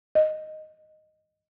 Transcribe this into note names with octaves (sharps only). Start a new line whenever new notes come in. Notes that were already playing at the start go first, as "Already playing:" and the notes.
D#5